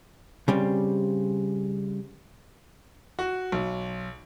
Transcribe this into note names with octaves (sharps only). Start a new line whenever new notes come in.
C#3 G3 C4
F#4
B1